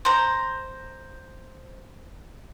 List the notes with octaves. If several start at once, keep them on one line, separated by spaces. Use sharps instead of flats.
C5 A#5